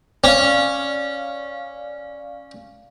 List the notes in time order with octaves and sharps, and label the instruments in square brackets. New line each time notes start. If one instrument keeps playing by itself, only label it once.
[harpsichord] C#4 [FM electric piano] D5 F5